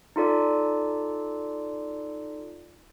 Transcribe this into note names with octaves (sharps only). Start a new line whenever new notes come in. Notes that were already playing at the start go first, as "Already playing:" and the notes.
D#4 F4 A4 D5